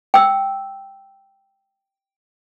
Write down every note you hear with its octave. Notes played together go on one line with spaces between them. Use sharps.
G5 E6